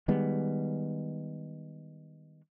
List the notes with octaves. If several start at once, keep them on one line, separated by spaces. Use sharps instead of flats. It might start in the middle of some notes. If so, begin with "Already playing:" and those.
D#3 G3 G#3 B3